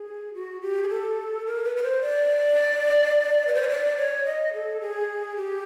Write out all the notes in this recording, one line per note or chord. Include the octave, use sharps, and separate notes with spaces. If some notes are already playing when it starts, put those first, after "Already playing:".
Already playing: G#4
F#4
G4
G#4
A4
A#4
B4
B4
C5
D5
B4
C5
C#5
D5
C#5
D#5
A4
G#4
G4